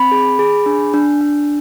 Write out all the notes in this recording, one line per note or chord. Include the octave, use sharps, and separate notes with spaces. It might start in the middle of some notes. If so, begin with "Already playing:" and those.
Already playing: C4 B5
G#4
G#4
D4
D4
D4